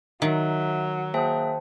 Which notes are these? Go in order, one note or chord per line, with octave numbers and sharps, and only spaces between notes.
D#3 F#3 E5
A#3 G#4 C5 E5 G5 A5